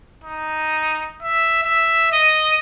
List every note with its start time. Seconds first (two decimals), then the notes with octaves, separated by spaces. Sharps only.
0.24 D#4
1.23 E5
1.63 E5
2.12 D#5